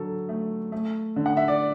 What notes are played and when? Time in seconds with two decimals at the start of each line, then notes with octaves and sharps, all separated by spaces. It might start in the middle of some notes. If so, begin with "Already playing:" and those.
Already playing: D3 F#3 A4
0.29 A3
0.72 A3
1.16 D3
1.26 F#5
1.37 E5
1.48 D5